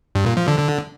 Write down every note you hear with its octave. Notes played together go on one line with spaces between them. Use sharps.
G2
A#2
F3
D3
D3